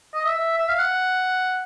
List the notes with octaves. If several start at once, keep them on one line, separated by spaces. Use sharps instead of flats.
D#5
E5
E5
F5
F#5